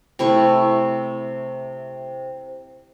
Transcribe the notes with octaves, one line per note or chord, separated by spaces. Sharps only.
C3 A3 E4 C#6